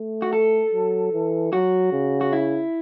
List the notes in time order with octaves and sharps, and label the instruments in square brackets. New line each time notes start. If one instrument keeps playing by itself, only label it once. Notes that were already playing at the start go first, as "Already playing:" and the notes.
Already playing: [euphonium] A3
[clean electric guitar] F#4
A4
[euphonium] F#3
E3
[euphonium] F#3 [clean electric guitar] F#4
[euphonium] C#3
[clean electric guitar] F#4
E4